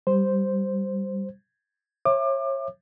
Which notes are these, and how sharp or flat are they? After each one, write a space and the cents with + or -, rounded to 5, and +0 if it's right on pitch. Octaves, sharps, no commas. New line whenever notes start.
G3 +0 C5 +0
C#5 -35 E5 +15 D6 +30